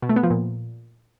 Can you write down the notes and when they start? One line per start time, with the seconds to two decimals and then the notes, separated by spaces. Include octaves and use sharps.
0.02 B2
0.09 A3
0.16 B3
0.23 F3
0.30 A#2